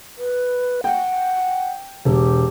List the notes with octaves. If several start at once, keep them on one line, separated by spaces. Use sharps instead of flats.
B4
F#5 G5
E1 G4